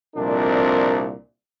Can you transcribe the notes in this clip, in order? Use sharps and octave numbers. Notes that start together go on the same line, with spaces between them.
C2 F2 A#2 C4 D4 A#4